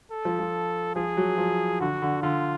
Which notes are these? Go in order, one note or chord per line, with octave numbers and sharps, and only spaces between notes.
A4
F3
F3
F3 G#4
F#3
F3
D3 F#4
D3
D3 F4